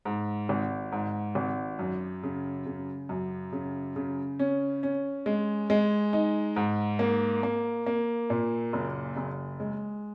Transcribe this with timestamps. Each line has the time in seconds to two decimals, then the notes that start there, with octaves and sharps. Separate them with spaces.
0.05 G#2
0.49 G#1
0.92 G#2
1.35 G#1
1.79 F#2
2.23 C#3
2.66 C#3
3.09 F#2
3.52 C#3
3.96 C#3
4.39 C#4
4.83 C#4
5.26 G#3
5.70 G#3
6.13 D#4
6.56 G#2
6.99 A#3
7.43 A#3
7.86 A#3
8.30 A#2
8.73 F#1
9.17 F#1
9.60 G#3